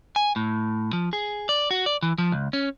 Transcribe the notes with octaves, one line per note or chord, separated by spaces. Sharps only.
G#5
A2
F3
G#4
D5
F#4
D5
E3
F3
C#2
C#4